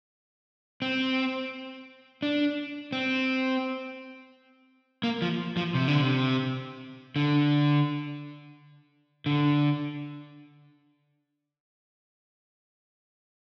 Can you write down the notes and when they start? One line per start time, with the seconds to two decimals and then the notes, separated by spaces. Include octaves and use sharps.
0.82 C4
2.22 D4
2.92 C4
5.03 A#3
5.22 F3
5.57 F3
5.75 C3
5.88 D3
6.01 C3
7.16 D3
9.26 D3